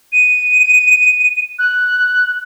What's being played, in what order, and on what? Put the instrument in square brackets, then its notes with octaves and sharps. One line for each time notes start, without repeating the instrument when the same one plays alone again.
[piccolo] D#7
F#6